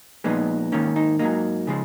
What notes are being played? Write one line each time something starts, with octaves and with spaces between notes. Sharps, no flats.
A#2 F3 G#3 B3 D#4
G#2 D#3 A#3 C#4
D#4
G#2 F#3 A#3 D#4
C#3 F3 G#3